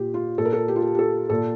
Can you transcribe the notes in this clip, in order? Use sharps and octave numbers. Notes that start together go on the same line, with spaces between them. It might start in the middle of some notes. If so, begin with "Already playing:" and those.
Already playing: A#2 G4
F4
A#2 A4
A#4
A4
G4
F4
G4
G4
A4
A#2 A4